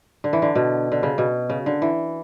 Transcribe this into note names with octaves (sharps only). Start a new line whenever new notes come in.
D3
E3
D3
B2
D3
C#3
B2
C#3
D3
E3